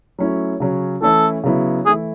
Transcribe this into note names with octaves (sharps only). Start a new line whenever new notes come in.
F#3 A3 C#4 E4
C#3 F#3 C#4
E3 A3 C#4 E4 A4
C#3 F#3 B3 E4
E3 A3 E4 G#4